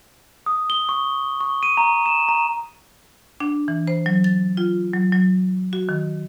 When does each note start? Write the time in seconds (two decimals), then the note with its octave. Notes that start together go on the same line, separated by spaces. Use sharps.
0.46 D#6
0.70 G7
0.89 C#6
1.41 C#6
1.63 D#7
1.77 A#5
2.06 E7
2.28 A#5
3.40 D4
3.68 E3
3.87 C5
4.06 F#3
4.24 A6
4.57 F4
4.93 F#3
5.12 F#3
5.73 F#4
5.89 D#3